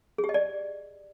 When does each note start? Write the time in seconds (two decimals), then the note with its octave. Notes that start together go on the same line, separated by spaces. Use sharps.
0.18 G#4
0.24 G4
0.29 D#5
0.34 D5